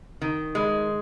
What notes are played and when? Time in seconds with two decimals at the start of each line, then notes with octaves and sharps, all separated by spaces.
0.21 D#3
0.55 G#3